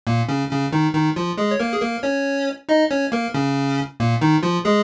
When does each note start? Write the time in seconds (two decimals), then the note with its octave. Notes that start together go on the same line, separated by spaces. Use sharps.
0.07 A#2 A#3
0.29 C#3 C#4
0.51 C#3 C#4
0.72 D#3 D#4
0.94 D#3 D#4
1.16 F3 F4
1.38 G#3 G#4
1.51 C#5
1.60 A#3 A#4
1.73 G#4
1.82 A#3 A#4
2.03 C#4 C#5
2.69 D#4 D#5
2.91 C#4 C#5
3.12 A#3 A#4
3.34 C#3 C#4
4.00 A#2 A#3
4.21 D#3 D#4
4.43 F3 F4
4.65 G#3 G#4